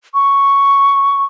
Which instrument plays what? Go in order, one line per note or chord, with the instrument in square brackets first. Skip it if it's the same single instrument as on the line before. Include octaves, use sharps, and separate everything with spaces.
[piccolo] C#6